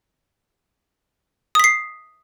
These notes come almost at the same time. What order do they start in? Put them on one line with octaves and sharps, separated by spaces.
D#6 B6 C7